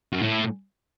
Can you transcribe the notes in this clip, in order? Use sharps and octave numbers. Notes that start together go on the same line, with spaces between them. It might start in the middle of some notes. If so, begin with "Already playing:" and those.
F#2
A2